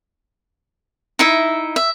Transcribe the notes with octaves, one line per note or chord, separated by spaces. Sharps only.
D#4 E4 E5
E5